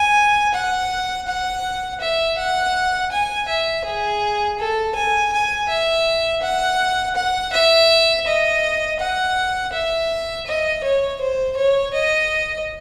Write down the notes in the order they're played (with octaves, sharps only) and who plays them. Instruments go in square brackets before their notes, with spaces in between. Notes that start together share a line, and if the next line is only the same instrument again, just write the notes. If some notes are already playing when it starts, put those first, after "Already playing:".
Already playing: [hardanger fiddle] G#5
F#5
F#5
E5
F#5
G#5
E5
G#4
A4
G#5
G#5
E5
F#5
F#5
E5
D#5
F#5
E5
D#5
C#5
C5
C#5
D#5